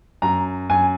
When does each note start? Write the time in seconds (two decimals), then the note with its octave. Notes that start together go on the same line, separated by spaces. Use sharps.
0.22 F#2 A#5
0.70 F#2 G#5